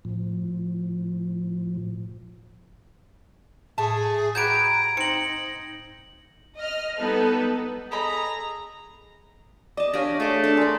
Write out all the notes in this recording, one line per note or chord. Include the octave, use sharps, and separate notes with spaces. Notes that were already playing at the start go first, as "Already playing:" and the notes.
A2 F3
A2 A3 G#4 A5
F#4 G4 B4 A#5 G6 G#6 D7
C4 D#4 C#7 F#7
D#5 F6
G3 B3 D#4 A4 B4
G#4 A4 D#5 A#5 B5
D5 D#5 A5
D4 G4 C#5 F5 G#5 A#6
A3 G#4 D6
D4 A4 A5
A#4 D5 G#5 B5 C6